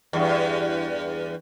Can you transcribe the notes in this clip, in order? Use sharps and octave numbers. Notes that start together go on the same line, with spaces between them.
E2 G2